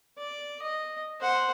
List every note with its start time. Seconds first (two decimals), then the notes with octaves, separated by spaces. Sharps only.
0.18 D5
0.62 D#5
1.21 C5 F#5